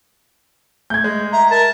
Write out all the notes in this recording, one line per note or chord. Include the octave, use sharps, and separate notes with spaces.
A3 G6 G#6
G#3
E5 A#5
A#4 A5